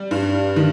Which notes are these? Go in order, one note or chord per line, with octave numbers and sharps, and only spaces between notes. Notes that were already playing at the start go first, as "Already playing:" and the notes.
Already playing: G3
G2
D#3